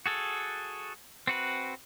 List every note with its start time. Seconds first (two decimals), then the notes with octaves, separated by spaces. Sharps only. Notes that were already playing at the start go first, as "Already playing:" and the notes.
0.06 F#4 G#4 A4
1.27 C4 F#4 B4